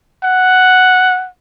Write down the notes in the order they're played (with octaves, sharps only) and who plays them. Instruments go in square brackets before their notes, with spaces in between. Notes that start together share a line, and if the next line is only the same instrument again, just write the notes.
[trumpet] F#5